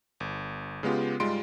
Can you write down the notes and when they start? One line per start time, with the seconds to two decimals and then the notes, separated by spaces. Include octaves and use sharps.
0.20 G1
0.83 C#3 G#3 B3 F4 G4
1.20 G#2 G3 G#3 F4 C6 D7